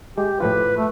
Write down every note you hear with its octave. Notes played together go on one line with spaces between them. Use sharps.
G#3 G4
A2 F3 F4 B4
A3